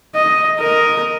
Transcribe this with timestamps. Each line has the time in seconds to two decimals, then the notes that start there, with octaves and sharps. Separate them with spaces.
0.15 D#5
0.60 A#4 D#5